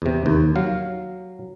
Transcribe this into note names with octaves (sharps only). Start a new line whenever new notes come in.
E2 C3
D#2
F#3 F5